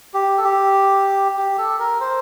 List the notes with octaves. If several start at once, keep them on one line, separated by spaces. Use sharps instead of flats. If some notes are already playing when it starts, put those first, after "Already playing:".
G4
A4
G4
G4
A4
A#4
C5